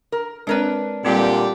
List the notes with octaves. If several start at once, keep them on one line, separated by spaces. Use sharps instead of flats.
A#4
G#3 C4 D4 A#4 B4 C#5
A#2 D3 G3 C4 G4